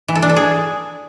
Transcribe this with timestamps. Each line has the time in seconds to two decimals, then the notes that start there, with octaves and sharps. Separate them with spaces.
0.08 E3
0.15 A4
0.22 D4
0.29 A4
0.36 G#4